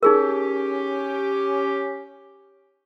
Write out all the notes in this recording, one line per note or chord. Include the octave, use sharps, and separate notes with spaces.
C#4 D#4 G4 G#4 A#4